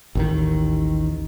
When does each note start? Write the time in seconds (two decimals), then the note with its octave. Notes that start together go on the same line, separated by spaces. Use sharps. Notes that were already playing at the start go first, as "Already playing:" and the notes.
0.15 A1 D#2 D#3